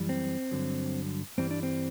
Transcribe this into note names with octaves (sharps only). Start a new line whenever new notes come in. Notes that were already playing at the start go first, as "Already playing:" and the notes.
Already playing: F#2 E3 G3
C4
G2 D3 F#3
G2 E3 G3 C4
D4
C4